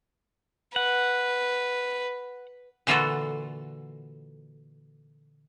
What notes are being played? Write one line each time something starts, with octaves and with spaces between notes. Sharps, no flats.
B4 F#5
A#2 D3 E3 F4 F#4 A4